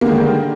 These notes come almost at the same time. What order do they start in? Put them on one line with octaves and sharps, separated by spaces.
A#3 D3 G#3 D#3 G3